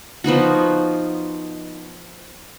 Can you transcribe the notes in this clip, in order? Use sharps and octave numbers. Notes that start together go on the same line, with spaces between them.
F3 B3 D#4 F#4